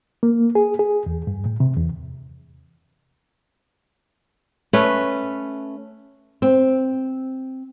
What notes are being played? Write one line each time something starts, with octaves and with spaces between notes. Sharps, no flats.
A#3
G#4
G#4
E2
G2
A2
C3
E2
A3 C#4 B4
C4